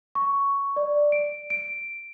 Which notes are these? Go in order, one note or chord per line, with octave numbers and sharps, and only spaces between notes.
C#6
D5
D7
D7